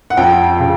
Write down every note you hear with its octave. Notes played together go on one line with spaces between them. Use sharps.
F#5
F2 G5
C#3